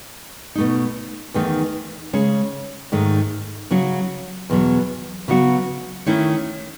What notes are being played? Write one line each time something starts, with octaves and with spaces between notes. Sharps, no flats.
B2 A3 D#4
E2 D#3 A3 D#4
C#3 G#3 C#4
G#2 D#3 A3
C#3 F#3 C#4 F#4
E2 B2 F#3
C#3 F#3 B3 F#4
D#3 A3 C#4 E4